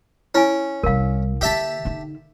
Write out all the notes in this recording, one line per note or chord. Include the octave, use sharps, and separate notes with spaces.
C#4 E4 G#5
C2 G3 A#4 F5
D3 A#3 G4 E5 A5
D3 D#4